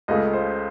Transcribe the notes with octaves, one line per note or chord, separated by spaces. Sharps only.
C#2 C#3 A3 D#5
C5